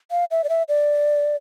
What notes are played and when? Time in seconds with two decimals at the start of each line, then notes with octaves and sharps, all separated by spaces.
0.11 F5
0.31 E5
0.44 D5
0.49 E5
0.69 D5